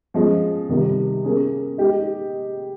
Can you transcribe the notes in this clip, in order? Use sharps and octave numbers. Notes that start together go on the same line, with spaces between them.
F3 G#3 C#4
C3 D#3 G3
A#3 C#4 G#4
G#3 D#4 G4